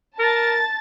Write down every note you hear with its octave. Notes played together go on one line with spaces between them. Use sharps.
A#4 A5 A6